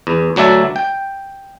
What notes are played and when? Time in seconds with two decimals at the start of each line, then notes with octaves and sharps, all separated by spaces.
0.07 E2
0.36 D2 F#3 D4 E5 A5
0.76 G5